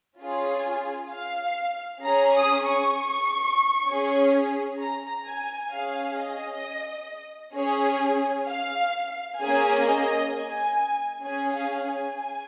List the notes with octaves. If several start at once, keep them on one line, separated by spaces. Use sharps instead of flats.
C#4 F4 G#4
F5
C#4 G#4 A#5
D#6
C#6
C#4 G#4
A#5
G#5
C#4 G#4 F5
D#5
C#4 G#4 C#5
F5
A#3 C#4 G#4 G#5
D#5
G#5
C#4 G#4 G#5
F5
G#5